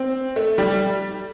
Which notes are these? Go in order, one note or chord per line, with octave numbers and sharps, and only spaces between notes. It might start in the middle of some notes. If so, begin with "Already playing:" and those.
Already playing: C4
A3
G3